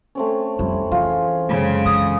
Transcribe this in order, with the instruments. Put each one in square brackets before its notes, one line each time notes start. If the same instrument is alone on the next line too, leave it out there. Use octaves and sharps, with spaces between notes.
[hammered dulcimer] A3 C4 C#4
[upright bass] F2 G3 [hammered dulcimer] E4
[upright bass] E3 [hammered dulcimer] F4 G#4
[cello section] F#2 C#3 G#3
[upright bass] E3 [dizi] D#6